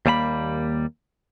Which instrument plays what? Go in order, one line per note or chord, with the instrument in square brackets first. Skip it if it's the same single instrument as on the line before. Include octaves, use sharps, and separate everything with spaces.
[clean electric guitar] D#2 G3 A#3 A5 B5